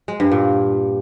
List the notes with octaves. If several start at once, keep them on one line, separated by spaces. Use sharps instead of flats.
G#3
G2
A#2